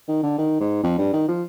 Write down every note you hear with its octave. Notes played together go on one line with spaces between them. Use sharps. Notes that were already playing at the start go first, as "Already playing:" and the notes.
D#3
D3
D#3
G#2
F2
G2
D#3
F3